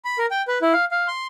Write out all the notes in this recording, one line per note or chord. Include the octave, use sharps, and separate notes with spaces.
B5
A#4
G5
B4
E4
F5
F5
C6